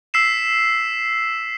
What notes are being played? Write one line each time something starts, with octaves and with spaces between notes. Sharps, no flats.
E6 B6 C7 E7